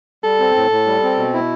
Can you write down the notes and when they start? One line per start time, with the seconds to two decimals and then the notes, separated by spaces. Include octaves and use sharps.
0.24 G3 A4
0.39 C4
0.55 A2
0.71 A2
0.87 G3
1.03 C4
1.18 B2
1.34 E4